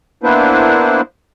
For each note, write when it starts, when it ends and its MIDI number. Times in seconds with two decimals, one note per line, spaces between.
0.23 1.01 58
0.23 1.01 59
0.23 1.01 62
0.23 1.01 64
0.23 1.01 71
0.23 1.01 72